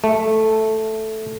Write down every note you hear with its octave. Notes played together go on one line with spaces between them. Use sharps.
A3